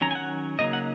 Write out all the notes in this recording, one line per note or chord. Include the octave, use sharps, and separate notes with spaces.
D#3 F#3 C#4 A#5
G#5
F#5
C#3 F#3 A#3 D#4 D#5
F#5